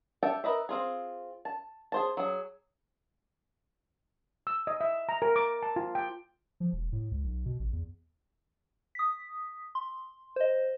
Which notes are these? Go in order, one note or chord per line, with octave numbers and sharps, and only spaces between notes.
G4 E5 F#5 G5 A5
A#4 B4 D#5 E5
C4 F4 G#4
A5
G#4 C5 A5
F#3 G#4
E6
D#5
E5
A#5
A#4
D6
A5
F4
G5
F3
E1
A2
C#2
B1
B2
A1
E2
D#6 B6
C6
C5 D#5